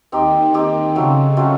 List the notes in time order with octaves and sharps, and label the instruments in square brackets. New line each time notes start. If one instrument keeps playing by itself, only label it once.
[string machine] D#2 D#3 [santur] C4 D#4 G4
[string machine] D#2 D#3 [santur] C4 D#4 G4
[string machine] C#3 [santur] F#3 A3 C4 F4
[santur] F#3 A3 C4 F4